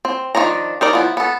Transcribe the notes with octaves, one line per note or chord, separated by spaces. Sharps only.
C4
D#3 F3 D4 A#5
D#4 A#4 D5
F3 B3 E4
B3 A4